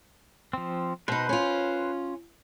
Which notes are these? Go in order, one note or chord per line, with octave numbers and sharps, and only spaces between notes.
F3 C4
B2 D#4 B4 C5
C#4 F4